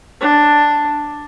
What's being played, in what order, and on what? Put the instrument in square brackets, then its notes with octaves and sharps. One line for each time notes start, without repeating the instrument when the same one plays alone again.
[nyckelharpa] D4